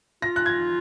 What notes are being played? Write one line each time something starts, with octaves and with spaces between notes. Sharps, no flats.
F4 A#6
F#6
G#6